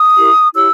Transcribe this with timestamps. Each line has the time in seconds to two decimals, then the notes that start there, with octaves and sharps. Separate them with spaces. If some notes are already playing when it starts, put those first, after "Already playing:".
Already playing: D#6
0.17 E4 G4 A#4
0.54 E4 G4 C#5 E6